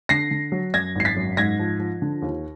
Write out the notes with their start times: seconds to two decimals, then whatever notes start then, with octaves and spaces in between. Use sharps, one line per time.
0.09 D3 A#6 C7
0.31 D3
0.52 F#3
0.74 F#2 G#6 A#6
0.95 G#1 C7
1.05 A6 B6
1.16 F#2
1.37 G#2 G#6 A#6
1.59 F3
1.79 F3
2.02 D3
2.22 D#2